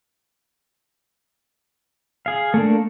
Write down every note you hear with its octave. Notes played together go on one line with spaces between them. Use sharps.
G#4 F5
A3 A#3 D4